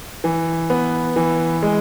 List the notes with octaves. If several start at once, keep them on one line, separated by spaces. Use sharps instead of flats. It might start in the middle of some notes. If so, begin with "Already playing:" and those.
E3
B3
E3
G#3